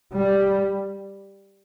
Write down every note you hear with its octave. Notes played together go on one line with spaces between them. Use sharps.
G3